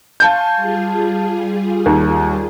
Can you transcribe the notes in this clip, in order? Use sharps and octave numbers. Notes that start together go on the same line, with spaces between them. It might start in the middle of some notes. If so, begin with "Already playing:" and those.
F5 G#5 A5 C6 C#6 G6
G3 F4 G#4
D#2